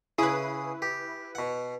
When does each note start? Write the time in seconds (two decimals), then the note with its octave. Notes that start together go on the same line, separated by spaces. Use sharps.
0.18 C#3 E4 G#4 B4 D#6
0.82 G4
1.35 B2 F#5